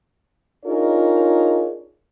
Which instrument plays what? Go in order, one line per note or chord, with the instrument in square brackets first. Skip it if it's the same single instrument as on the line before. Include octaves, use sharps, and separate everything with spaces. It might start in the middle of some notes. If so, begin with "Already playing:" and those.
[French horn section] D4 D#4 F4 G#4 A#4 C#5